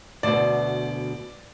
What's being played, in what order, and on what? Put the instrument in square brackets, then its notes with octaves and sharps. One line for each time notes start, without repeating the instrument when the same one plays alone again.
[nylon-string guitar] D2 B2 [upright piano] D5